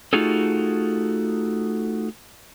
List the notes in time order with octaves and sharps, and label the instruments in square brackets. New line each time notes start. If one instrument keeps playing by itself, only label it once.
[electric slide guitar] A3 D#4 F4 F#4 G#4 A4